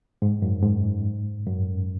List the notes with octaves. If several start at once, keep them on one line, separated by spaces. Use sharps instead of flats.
G#2
F#2
G#2
F#2